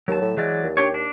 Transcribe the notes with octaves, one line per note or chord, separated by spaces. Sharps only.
D#2 F#3 A5
A2
E3 F#3 G#3 D5
D#2
D4 G4 C#5
D4